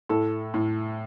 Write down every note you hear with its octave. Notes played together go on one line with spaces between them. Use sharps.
A2 A4
A2